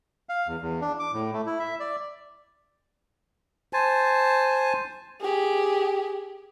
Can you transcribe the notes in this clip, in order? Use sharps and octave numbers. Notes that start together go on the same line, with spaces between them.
F5
E2
E2
D4
D6
A2
A3
E4
E5
D5
C5 G#5 A5
G4 G#4